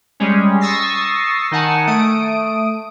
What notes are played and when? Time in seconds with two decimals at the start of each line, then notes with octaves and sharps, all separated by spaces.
0.20 G3 G#3 C#4
0.61 C#6 D#6 E6 A6 A#6 C7
1.51 D#3 D#4 F#5 G#5 A5
1.87 A3 D#6 D7